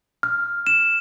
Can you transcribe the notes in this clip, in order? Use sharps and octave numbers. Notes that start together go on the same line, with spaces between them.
F6
E7